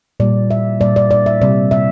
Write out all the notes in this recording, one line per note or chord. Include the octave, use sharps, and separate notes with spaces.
A#2 G3 A#3 D5
E5
A#2 G3 A#3 D5
D5
D5
E5
C3 G3 C4 D5
E5